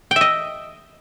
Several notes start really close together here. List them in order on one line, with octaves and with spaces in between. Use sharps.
G5 E5 D#5